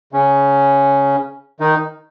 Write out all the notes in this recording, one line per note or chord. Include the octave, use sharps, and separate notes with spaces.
C#3 C#4
D#3 D#4